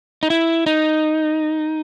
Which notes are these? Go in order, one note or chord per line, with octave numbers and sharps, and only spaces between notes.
D#4
E4
D#4